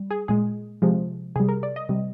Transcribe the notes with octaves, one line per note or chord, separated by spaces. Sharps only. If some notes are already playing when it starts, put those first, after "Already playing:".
Already playing: G3
G#4
A#2 G#3 G#4
C3 F3 G#3
C3 G3 G#4
A#4
D5
D#5
C3 G3